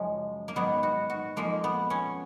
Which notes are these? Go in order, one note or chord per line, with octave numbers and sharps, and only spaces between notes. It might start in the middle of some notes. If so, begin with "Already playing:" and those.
Already playing: F#2 C#3 F3 G#3
A#3
G#2 D#3 F#3 B3
F#4
F#4
F2 F3 G#3 A#3
B3
C#4